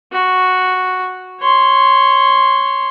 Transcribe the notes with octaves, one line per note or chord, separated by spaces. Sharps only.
F#4
C#5 C6